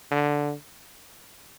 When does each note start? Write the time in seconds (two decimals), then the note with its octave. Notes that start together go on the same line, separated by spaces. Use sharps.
0.11 D3